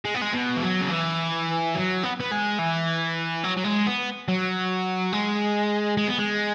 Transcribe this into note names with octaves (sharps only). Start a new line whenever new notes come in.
G#3
B3
G#3
B2
E3
F#3
C#3
E3
F#3
B3
B3
G#3
E3
F#3
F#3
G#3
B3
F#3
G#3
G#3
B3
G#3